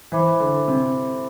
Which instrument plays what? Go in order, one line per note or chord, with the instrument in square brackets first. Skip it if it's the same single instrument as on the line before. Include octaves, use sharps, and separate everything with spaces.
[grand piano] E3 [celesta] C5 E5 B5 D6
[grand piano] D3
C3